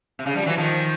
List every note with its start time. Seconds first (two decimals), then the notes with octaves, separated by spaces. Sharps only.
0.19 C3
0.26 C#3
0.35 F3 G3
0.46 E3 F#3
0.57 D#3 F3